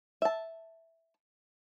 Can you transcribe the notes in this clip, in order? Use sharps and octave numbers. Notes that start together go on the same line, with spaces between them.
E5 A5